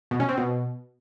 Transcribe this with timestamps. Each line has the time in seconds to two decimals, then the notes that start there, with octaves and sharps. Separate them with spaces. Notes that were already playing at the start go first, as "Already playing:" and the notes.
0.11 B2
0.20 C#4
0.29 C4
0.37 B2